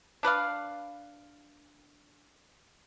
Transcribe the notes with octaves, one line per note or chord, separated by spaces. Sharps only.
D4 B4 D5 F5